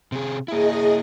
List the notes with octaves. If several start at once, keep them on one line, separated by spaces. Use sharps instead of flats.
C3 G#4
A#3 E4 G#4 D#5